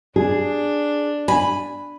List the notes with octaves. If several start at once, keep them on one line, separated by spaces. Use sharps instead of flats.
D4 G#4
G#5 B5